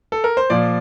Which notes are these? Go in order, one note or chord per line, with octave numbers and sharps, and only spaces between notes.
A4
A#4
C5
A#2 F3 D5